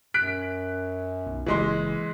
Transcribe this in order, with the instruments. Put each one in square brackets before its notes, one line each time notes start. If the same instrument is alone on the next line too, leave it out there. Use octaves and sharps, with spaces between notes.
[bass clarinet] F#2 [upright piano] F#6 B6 D7
[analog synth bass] B1
[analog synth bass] F#1 [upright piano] E3 G#3 C6